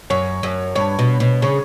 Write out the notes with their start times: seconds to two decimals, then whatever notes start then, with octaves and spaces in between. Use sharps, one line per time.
0.10 F#2 C#5
0.43 F#2
0.75 G2 C#5
0.99 B2
1.20 B2
1.42 C#3 C#5